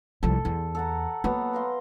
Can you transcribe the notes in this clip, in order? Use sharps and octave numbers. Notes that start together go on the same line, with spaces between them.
C2 F3 A4
E2
A4 F#5 A#5
F#3 A#3 B3
A#4 F5 C6